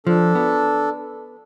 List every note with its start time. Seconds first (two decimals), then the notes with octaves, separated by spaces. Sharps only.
0.07 F3 D4 A4
0.35 B3